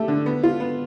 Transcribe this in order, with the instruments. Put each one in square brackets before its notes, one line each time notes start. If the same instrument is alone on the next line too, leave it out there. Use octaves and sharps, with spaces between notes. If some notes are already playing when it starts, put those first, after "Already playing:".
Already playing: [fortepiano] A3 G4
D3
B3
F4
B3